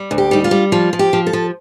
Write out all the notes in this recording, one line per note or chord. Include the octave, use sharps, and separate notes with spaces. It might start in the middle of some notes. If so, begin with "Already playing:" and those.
Already playing: G3
D2
G4
G3 D#4
F4
G3
F3 F4
F3
G4
F3
A4
F3